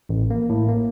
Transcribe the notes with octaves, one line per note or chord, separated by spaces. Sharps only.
A1
A#3
A2
A#3